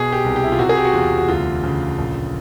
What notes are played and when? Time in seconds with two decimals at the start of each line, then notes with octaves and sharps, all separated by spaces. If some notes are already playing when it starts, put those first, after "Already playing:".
Already playing: B2 G#4
0.12 G4
0.24 C2
0.36 G4
0.44 E4
0.52 F4
0.59 C3 F#4
0.69 G#4
0.77 G4
0.85 F#4
0.93 E2 F4
1.18 F#4
1.28 D2 F4
1.63 C#3
1.98 A#1